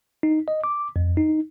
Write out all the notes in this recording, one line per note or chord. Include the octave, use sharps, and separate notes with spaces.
D#4
D#5
D6
F2
D#4